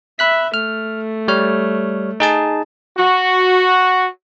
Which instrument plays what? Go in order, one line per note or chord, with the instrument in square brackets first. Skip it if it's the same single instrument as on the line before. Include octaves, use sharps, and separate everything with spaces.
[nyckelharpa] E5 [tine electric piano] B5 F#6 B6
[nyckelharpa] A3 [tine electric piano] F6
[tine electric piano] G3 C#5 F6
D#4 G#4 A5
[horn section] F#4